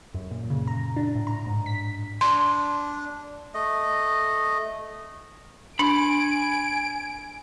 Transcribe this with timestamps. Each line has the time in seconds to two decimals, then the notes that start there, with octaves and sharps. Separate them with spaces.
0.15 F#2
0.31 A#2
0.50 C#3
0.67 A#5
0.96 D4
1.15 A2
1.27 A#5
1.46 G#2
1.66 B6
2.21 D4 C6
3.54 A3 D#5
5.79 D4 G#5 B5 D7